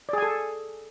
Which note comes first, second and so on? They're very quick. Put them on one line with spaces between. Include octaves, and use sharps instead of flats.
D5 G#4 G#5 A4